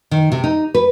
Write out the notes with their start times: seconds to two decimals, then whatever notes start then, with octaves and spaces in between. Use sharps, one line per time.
0.11 D#3
0.32 C3
0.44 D#4
0.74 B4